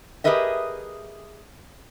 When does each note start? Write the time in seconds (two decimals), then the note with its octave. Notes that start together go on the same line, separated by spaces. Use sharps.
0.24 G4 G#4 A#4 B4 D#5 E5